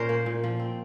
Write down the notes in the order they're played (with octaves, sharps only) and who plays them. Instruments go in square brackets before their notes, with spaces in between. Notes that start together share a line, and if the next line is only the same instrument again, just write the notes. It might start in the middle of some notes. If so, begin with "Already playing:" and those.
Already playing: [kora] A#2 C#4 A#4 C5
A#3
A#2
F3
C4